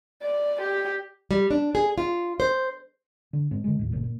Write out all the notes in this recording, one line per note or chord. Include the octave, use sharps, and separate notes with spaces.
D5
G4
G3
D4
G#4
F4
C5
D3
G#2 G#3 C4
D3 G#3
D#2 A2
G1 A#2 C#3
A#2